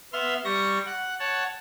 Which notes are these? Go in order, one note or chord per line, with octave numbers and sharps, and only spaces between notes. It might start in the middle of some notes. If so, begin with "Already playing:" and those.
B3 E5 C6 F6
G3 C#6 A#6
F#5
C#5 F#5 A5